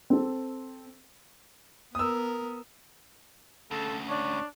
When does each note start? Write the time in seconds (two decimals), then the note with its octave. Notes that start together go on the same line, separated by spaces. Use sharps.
0.10 C4 A4
1.95 B3 A#4 D#6 E6
3.71 D2 C#3 A4
4.09 D4 C#5